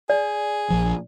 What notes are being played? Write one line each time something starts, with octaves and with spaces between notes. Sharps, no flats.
G#4 D5
A#1 F3